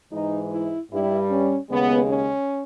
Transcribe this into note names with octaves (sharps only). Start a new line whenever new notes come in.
G#2 E3 G#3 D#4
E4
G2 G3 E4
C#4
D#2 C#3 G#3 B3
C#4